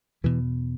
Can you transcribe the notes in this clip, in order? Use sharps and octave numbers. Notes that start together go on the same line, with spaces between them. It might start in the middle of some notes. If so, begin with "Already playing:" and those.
E2 B2 E3